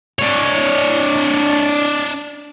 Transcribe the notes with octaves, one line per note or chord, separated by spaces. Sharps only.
D4 C#5